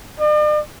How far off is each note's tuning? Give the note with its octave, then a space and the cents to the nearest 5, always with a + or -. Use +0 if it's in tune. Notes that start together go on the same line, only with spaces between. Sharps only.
D5 +45